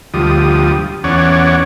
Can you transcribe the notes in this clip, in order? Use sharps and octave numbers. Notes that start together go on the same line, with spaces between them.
D2 F3 G3 D#6
E2 C#4 C#5 D5 F#5